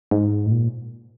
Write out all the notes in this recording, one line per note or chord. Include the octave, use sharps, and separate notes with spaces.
G#2
A2
A#2